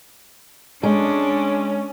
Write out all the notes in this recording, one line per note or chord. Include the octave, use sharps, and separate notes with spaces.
G#3 C#4 D4